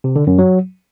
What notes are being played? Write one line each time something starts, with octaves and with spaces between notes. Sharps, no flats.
C3
D3
F#2
F#3